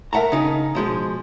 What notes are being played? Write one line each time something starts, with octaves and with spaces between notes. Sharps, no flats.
A#4 E5 F#5 A5 A#5
C#3 D#4 G#5
B2 F3 G#3